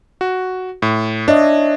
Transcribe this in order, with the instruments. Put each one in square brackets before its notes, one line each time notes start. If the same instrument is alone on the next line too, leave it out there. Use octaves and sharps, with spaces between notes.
[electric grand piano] F#4
A2
[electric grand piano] D4 [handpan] C#5 D#5 E5